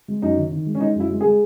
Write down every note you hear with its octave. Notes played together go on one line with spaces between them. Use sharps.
G#3
F#2 D#4
D#3
D#3
G#3
C#4
G#3 D#4
F#2 E4
G#3
G#3 G#4